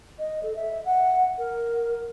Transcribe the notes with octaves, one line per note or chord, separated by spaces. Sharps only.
D#5
A4
E5
F#5
A#4